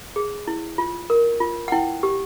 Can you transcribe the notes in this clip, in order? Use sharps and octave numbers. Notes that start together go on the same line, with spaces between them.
G#4
E4
F4
A#4
F4
F#5
E4 G5
G4